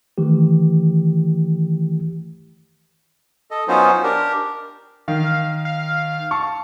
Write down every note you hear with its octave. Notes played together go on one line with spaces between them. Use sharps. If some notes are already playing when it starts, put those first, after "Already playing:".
D#3 E3 A3 G4
A4 D#5
F#3 B3 C#4 D#4 F4 C5
D4 G4 A#4
D#3 F5
F5
A5 C#6